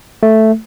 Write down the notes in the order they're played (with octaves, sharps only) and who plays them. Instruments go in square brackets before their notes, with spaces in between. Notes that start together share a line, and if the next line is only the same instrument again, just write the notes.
[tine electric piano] A3